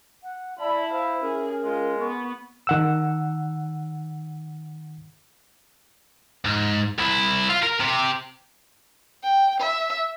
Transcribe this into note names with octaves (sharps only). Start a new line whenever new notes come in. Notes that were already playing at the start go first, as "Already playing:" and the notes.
F#5
E4 D5 A5 B5
C5 F5
C#4 G#4 A#4
G#3 F4
B3 C#6
D#3 F#5 E6
G#2
C2 E4
F4
A#4
C3 G4
G5
E5